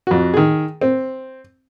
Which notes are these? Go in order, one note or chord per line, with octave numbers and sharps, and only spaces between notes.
F2 F#4
D#3 G#4
C4